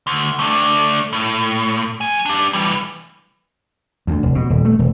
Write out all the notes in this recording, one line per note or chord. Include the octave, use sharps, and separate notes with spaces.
D2
A3 D4
A2
F3 G#5
D4 G4
E3 G3
D2
F1
B2
D#1
A3
E1